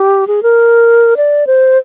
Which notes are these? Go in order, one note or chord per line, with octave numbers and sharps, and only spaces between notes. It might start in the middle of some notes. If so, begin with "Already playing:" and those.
Already playing: G4
G#4
A#4
D5
C5